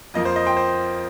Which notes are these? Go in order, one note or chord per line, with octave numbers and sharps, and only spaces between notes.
F2 F3 A#3 D#5
C5
D#5
G5 C6
C5